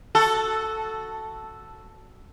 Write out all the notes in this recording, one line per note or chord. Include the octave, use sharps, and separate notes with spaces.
F#4 A4